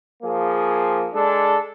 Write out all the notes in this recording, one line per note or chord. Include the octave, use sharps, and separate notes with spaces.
F3 A#3 G#4
G#3 D4 A4